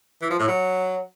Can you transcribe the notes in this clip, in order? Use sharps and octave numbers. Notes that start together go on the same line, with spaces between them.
E3
F3
A2
F#3